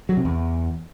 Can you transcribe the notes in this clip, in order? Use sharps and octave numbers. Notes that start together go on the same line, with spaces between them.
F#3
C3
E2